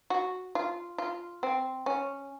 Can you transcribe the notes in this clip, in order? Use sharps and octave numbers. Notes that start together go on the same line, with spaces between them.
F#4
F4
F4
C4
C#4